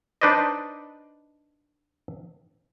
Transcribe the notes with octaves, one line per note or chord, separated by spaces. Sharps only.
D4 D#4 B4 C5 D5 D#5